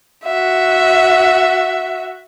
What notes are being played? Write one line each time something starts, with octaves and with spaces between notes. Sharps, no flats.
F#4 E5